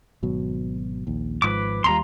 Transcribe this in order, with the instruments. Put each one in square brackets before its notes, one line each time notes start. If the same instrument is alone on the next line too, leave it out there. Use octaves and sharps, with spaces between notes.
[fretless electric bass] G#1 B2 F#3
A#1 D#2
[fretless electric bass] G#1 G#2 F3 [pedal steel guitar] B4 D6
[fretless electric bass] D#2 G3 [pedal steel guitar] F4 A#5 C6